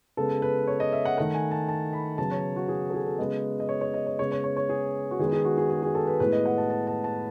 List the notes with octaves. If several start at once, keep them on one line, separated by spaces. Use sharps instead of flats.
C#3 G#3 B3 A4
B4
C#5
D#5
E5
F#5
D#3 A3 F#5
G#5
A5
A5
B5
C#3 F#3 B3 A5
C#5
F#4
G#4
A4
G#4
A4
C#3 G#3 B3 D#5
D#5
C#5
C#5
D#5
C#5
C#3 G#3 B3 C#5
C#5
C#5
C#5
G#4
F#4
D#3 G#3 B3 G#4
G#4
F#4
G#4
G#4
G#4
A4
B4
A2 G#3 B3 B4
D#5
F#5
A5
A5
A5
A5